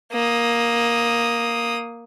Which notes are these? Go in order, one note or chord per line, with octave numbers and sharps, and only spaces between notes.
A#3 D#6